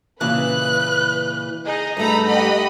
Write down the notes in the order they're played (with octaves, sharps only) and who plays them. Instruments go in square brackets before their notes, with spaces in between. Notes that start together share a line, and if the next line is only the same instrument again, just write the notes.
[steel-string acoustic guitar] A#2 C#3 E3 [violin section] B4 [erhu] F#6
[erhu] D#4 [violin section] G#4 D#5
[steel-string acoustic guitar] G2 A3 [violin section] A#5 B5
[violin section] G4 F#5 B5 [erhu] D#5